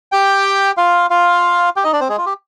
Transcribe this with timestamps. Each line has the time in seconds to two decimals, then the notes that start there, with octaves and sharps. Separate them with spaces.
0.12 G4 G5
0.77 F4 F5
1.10 F4 F5
1.76 G4 G5
1.84 D#4 D#5
1.93 D4 D5
2.01 C4 C5
2.09 G#3 G#4
2.18 F4
2.26 G4